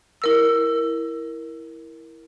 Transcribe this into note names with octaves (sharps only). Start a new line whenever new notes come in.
E4 A#4 E6